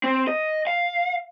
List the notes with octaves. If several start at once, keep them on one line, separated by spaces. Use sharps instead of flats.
C4
D#5
F5